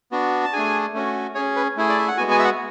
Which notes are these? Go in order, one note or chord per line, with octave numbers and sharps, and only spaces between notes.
B3 D4 F#4
A5
A3 D4 G#4 G#5
A3 C#4 F#4
C#4 G#4 C#5
B4
A3 E4 G#4
D5
E5
F#5
G#3 B3 F#4 G#5
G#5
E5
F#5